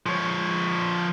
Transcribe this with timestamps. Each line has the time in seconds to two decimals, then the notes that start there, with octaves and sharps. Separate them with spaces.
0.06 F3 C#5